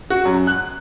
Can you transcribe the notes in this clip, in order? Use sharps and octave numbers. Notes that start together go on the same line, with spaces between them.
F#4
F#2
F#6